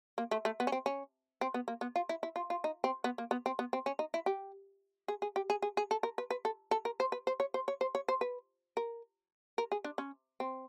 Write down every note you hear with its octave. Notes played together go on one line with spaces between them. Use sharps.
A#3
A3
A3
B3
C#4
C4
C#4
C4
B3
A#3
B3
F4
E4
E4
F4
F4
D#4
C4
B3
A#3
B3
C4
B3
C4
C#4
D#4
E4
G4
G#4
G#4
G4
G#4
G#4
G#4
A4
A#4
B4
B4
A4
A4
A#4
C5
B4
C5
C#5
C5
C#5
C5
C#5
C5
B4
A#4
A#4
G#4
D4
C#4
C4